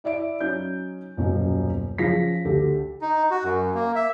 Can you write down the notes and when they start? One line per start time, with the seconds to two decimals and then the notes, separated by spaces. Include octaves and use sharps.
0.04 E4 D5 E5 D7
0.40 F#3 C#4 D#4 G6
1.17 D#1 F#2 B2 F#3
1.98 F3 C#4 F4 G#4 A#6 B6
2.45 D2 G4 A4
3.02 D#4
3.31 F#4
3.44 F#2
3.75 A#3
3.95 E5